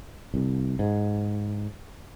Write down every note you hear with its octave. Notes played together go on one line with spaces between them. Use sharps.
C2
G#2